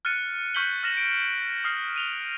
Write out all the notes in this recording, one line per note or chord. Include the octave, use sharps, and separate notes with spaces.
F6 F#6 A6 C#7 D#7
C#6 F6 G6 B6 F#7 G7
F6 A#6 E7 F#7
D7
D#6 F6 C7
D#7 F7 G7